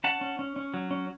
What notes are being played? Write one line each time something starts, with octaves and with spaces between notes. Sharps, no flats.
C#4 F#5 A5
C#4
C#4
C#4
F#3
C#4